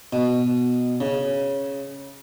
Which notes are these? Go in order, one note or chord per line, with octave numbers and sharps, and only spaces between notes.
B2
C#3